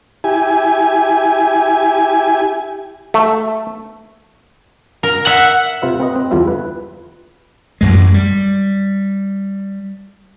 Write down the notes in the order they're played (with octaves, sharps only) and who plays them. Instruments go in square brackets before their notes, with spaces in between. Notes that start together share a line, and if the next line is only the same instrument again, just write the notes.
[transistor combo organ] E4 G4 G#5
[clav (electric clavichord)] A3
[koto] A#4
[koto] E5 [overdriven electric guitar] F#5
[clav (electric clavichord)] C3 F4 B4 E5
C4 B4 D#5
C4
E2 D3 F3 G3 F4 E5
B4
[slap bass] A1 F#2 G#3
G3